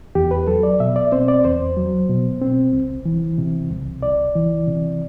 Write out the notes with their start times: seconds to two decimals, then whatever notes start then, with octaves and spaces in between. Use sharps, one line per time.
0.15 E2 G4
0.31 B4
0.47 F#3 A4
0.63 D5
0.80 B2 E5
0.96 D5
1.12 C4 C5
1.28 D5
1.45 E2 C5
1.77 F#3
2.09 B2
2.42 C4
2.73 C2
3.05 E3
3.38 C3
3.71 C2
4.03 C2 D5
4.35 E3
4.67 C3